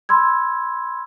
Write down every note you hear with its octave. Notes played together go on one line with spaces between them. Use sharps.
B5 C6 E6 G#6